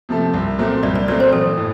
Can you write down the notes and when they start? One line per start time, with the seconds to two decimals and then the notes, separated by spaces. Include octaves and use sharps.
0.09 C3 F3 A3
0.34 C2
0.59 A#2 F#3 A3 C4
0.83 C2 D5
0.95 D5
1.08 A#2 F#3 A3 C4 D5
1.20 C5
1.32 A1 A4
1.57 A2